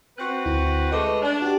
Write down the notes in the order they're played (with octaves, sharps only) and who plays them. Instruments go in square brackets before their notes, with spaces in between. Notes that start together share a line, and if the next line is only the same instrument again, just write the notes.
[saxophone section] C4 F#4 B4 [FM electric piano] F#6
[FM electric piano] D2 E4
[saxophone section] G#3 A3 D#5 [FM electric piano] B4 D6
[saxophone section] D4
[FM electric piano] F#4 G4